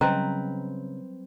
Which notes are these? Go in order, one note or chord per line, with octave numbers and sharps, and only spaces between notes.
C#3 F#3 G3 C4 B4 D#5 G5 A#5